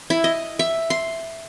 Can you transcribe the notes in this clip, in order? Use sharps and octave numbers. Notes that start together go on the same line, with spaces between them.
E4
D#5
E5
C6